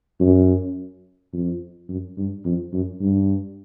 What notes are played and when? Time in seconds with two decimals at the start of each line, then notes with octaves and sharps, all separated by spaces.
0.20 F#2
1.33 F2
1.89 F#2
2.17 G2
2.45 F2
2.73 F#2
3.01 G2